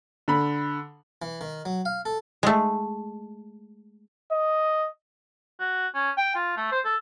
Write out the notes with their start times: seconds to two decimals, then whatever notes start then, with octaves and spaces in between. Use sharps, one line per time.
0.28 D3 B5
1.22 E3
1.41 D#3
1.65 F#3
1.85 F5
2.05 A4
2.43 G#3 A3
4.32 D#5
5.60 F#4
5.95 C#4
6.18 G5
6.35 F4
6.57 A3
6.72 C5
6.85 A4